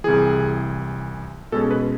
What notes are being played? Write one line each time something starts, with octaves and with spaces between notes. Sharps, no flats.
C2 C3 E3 G#4
B2 G#3 C#4 A4
B4